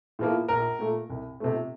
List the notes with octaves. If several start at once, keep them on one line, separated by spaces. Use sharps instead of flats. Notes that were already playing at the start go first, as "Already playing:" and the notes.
A2 F3 A#3
A#1 A#4
A#2 A3
C2
C3 F3 A3